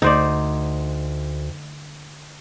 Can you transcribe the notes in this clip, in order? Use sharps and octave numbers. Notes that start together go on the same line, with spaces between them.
D2 D#4 C5 D5